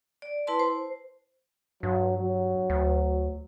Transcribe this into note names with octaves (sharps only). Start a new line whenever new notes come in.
D5
E4 B4 A5 C6
C5
G2 F#3
F#3
D2